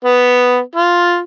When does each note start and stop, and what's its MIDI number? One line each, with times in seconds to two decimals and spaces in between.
0.05 0.59 59
0.76 1.19 65